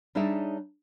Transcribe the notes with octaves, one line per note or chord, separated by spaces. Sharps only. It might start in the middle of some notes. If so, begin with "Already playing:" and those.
G3 D4 D#4 G#4 C#5 E5